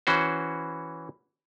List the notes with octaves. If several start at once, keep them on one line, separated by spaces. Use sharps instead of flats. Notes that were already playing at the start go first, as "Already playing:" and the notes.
E3 C#4 F#4 C5